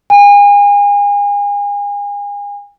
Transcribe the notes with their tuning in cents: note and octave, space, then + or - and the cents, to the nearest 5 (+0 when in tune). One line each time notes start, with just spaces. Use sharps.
G#5 -35